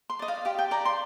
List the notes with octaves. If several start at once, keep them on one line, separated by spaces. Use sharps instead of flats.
C6
D5 D#5
F5
G4 F5
G5
D5 A#5
C6